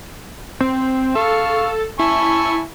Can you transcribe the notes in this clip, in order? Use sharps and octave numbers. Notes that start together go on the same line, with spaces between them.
C4
A4 F5 C#6
E4 G#5 A5 C#6